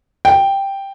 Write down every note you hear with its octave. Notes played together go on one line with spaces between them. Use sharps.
G5